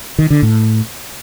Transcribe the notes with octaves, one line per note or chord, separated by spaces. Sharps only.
D#3
D3
A2